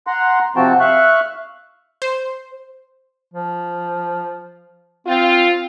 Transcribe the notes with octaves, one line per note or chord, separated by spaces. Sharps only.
F#5 A#5 C6
C3 F3 C4 F#4 G5 A5
E5 F5 C#6 F#6
C5
F3
C4 F4